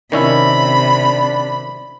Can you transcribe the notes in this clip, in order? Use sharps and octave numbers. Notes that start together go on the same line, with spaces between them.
C3 D#3 C#4 D4 E4 B5